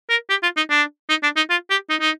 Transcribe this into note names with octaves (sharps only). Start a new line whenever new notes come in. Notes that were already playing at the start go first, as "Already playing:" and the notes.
A#4
G4
F4
D#4
D4
D#4
D4
D#4
F4
G4
D#4
D#4